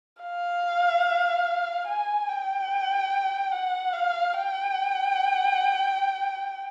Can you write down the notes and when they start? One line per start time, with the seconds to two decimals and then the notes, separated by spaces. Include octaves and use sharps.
0.22 F5
1.87 G#5
2.28 G5
3.52 F#5
3.92 F5
4.34 G5